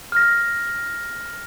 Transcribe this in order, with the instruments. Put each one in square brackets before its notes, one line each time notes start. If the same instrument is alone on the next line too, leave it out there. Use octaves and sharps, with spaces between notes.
[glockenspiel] F6 A#6